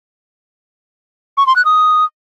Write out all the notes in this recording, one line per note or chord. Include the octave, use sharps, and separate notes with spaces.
C#6
C6
F#6
D#6